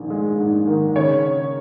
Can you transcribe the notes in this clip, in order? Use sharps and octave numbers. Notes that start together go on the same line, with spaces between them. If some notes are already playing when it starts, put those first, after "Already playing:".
Already playing: A#1 G#2 D#3
G#3
G#2
D#3
C#3 C#5